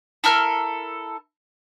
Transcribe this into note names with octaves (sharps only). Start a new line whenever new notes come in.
E4 A4 A#4 F6